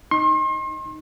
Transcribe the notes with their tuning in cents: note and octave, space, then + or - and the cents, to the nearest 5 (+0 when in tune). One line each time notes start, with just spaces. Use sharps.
D#4 +0 C6 +40